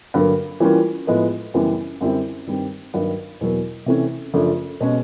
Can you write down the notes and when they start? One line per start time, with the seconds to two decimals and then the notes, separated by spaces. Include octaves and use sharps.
0.14 G2 D3 F#3 A#3
0.60 E3 G3 A#3 C#4 F4
1.07 A2 F3 G#3 B3
1.54 F#2 C#3 E3 G3 B3
2.01 F#2 D3 G3 C4 E4
2.47 G2 D#3 G3 C4
2.94 G2 D#3 F#3 A#3 D#4
3.41 E2 B2 F#3 A#3
3.86 C3 E3 A3 C#4
4.34 F#2 C#3 F3 A3 D4
4.81 B2 G#3 C#4